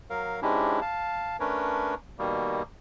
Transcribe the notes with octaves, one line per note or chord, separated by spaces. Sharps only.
F#3 A#4 F5
G#2 G#3 C#4 D4 E4 G4
F5 A5
A3 C#4 D4 A#4 B4 C#5
B2 D#3 G3 A#3